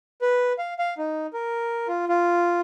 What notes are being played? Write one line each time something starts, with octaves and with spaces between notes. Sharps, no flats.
B4
F5
F5
D#4
A#4
F4
F4